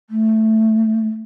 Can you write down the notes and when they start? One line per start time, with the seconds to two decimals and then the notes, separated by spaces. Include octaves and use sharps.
0.10 A3